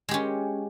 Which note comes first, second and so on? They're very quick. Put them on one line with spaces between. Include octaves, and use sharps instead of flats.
G#3 G4 C#4